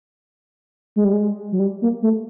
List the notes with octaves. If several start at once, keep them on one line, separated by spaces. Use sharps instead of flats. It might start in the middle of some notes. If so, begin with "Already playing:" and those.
G#3
G3
G#3
F#3
G3
A#3
A3